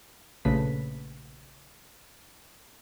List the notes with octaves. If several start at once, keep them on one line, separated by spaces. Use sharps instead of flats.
A#1 C#3 A3 B4 B6